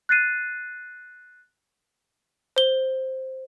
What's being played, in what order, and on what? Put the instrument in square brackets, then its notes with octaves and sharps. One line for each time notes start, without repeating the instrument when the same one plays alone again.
[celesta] F#6 A6 C7 D#7
[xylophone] C5 G7